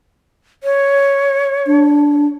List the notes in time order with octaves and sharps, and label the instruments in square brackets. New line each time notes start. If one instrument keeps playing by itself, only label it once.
[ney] C#5
[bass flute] D4